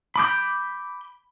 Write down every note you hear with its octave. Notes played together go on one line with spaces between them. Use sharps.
B5 D6 G6